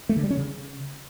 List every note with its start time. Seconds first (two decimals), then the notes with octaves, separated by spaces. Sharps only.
0.09 A3
0.16 D3
0.23 G3
0.30 C#4
0.37 C#3